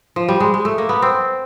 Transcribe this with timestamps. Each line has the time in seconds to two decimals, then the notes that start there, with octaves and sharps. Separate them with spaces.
0.16 F3
0.29 G3
0.40 G#3
0.54 G#3
0.65 A3
0.78 A#3
0.89 B3
1.02 C4